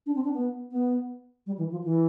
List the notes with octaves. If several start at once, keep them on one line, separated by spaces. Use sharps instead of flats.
D4
C4
D4
B3
B3
G3
E3
F3
E3